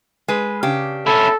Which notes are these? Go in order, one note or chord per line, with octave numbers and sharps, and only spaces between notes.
G#3 B4
C#3 D4 G4
C#4 E4 A4